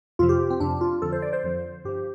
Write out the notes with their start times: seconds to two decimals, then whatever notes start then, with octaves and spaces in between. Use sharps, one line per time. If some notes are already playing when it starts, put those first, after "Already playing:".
0.19 F2 C3 F3 F4
0.29 G4
0.50 C4
0.60 F2 C3 F3 D4
0.81 F4
1.02 F2 D3 F3 A4
1.12 C5
1.22 D5
1.33 C5
1.44 F2 D3 F3
1.85 G2 F3 G4